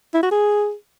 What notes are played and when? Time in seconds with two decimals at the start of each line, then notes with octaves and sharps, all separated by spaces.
0.14 E4
0.23 F#4
0.31 G#4